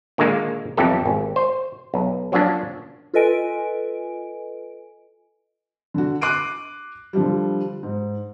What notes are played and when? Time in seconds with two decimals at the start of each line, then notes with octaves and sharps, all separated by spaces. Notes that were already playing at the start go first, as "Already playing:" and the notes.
0.18 A#2 D3 D#3 G#3 A#3
0.77 B1 F2 E3 G4 A4
1.06 G#1
1.36 C5
1.94 B1
2.32 F3 F#3 A#3 C#4 D4
3.14 F4 A4 B4 D#5 G#5 D7
5.94 D3 F#4
6.21 D6 F#6 C7 D7 D#7
7.13 D3 F3 G3
7.83 G#2